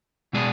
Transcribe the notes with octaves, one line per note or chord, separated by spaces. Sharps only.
B2 G#3 D4 G#4